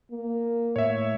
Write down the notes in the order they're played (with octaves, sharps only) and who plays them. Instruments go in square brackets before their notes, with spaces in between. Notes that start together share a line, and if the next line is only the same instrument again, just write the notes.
[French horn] A#3
[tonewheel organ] A2 [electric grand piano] C#5 E5